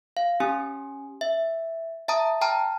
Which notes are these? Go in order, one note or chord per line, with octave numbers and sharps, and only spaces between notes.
F5
C#4 G4 G#5 D#6
E5
E5 A5 A#5 D#6
G5 A5 A#5 F6